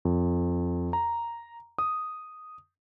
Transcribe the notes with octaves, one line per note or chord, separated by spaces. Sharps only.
F2
A#5
D#6